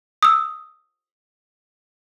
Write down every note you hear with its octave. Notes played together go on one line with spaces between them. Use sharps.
D#6 E6